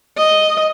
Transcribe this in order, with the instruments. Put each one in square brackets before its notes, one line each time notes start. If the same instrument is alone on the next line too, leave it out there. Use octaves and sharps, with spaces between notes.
[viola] D#5